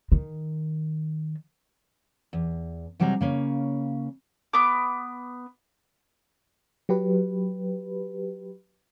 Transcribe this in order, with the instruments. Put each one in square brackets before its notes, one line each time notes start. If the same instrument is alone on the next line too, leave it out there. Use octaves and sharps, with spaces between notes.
[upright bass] D#3
[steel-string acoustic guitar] E2
C3 F#3 G3 G#4 A5 A#5
C#3 A#3 C#4
[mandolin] B3 D6
[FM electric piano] F#3 G4 B4